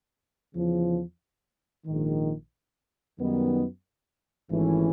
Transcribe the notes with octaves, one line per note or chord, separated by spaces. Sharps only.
E2 C#3 F3
A#1 G#2 D#3
F#2 D#3 G3 B3 D#4
G#1 G#2 E3 A3 C#4